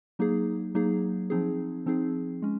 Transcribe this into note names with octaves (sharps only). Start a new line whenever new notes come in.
F#3 A#3 D#4 G#4
F#3 A#3 D#4 G#4
F3 C4 D#4 G#4
F3 C4 D#4 G#4
G#3 C#4